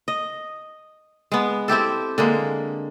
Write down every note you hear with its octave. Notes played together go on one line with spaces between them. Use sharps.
D#5
G#3 B3
C4 E4 G4 A4
D3 G#3 A#3